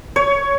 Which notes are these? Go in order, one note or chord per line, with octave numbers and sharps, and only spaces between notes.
C#5